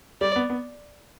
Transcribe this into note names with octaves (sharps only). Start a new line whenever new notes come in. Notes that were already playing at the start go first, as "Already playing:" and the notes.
G3 D5
B3
B3